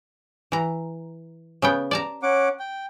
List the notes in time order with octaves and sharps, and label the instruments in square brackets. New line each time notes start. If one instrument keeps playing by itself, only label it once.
[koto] E3 A#5
C#3 B3 G5
D5 A5 A#5
[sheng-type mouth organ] C#4 F#5 D6
G5